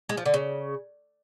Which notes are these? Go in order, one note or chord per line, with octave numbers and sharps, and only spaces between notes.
G#3
F3
D3
C#3